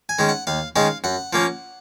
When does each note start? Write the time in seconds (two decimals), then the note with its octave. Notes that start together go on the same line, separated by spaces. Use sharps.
0.09 G#5
0.19 D#3 G#3 C#4
0.29 F#5
0.47 D#2 F5
0.76 D#3 G#3 C#4 F5
1.04 F#2 F#5
1.33 F3 A#3 C#4